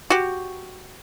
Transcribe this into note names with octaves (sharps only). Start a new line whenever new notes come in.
F#4 G4